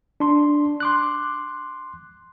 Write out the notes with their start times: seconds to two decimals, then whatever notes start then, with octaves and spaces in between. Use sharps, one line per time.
0.20 D4 C6
0.80 C6 D6 F#6